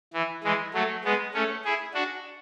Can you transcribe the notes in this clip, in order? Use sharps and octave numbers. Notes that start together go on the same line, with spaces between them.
E3
E3 G#3
F#3 A3
G#3 B3
A3 C#4
E4 G#4
D4 F#4